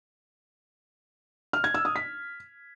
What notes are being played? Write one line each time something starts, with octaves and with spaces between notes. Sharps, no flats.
F6
G#6
E6
D#6
B6